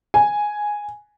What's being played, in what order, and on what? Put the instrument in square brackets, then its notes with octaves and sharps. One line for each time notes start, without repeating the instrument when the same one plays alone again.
[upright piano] G#5